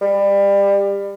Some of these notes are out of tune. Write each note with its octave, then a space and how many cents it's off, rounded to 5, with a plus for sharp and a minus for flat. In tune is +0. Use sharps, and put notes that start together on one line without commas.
G3 +25